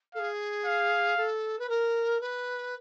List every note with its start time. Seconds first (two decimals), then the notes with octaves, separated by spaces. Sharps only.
0.14 A4 F5
0.19 G#4
0.66 F5
1.17 A4
1.59 B4
1.69 A#4
2.21 B4